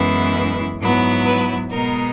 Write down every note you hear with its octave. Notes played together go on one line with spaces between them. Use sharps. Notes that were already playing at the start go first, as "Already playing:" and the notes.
Already playing: F#2 E3 G#3 B3 E4
G#2 F#3 B3 E4
B4
B2 G#3 B3 D#4 A#4